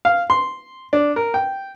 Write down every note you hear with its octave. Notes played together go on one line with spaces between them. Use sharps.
F5
C6
D4
A#4
G5